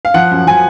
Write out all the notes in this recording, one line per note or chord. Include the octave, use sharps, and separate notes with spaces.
F5
F3 F#5
F#2
F3 G#5